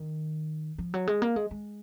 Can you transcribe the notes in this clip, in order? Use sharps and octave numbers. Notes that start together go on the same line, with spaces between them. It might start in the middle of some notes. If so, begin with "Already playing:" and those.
Already playing: D#3
F3
F#3
G#3
A#3
G#3
G#3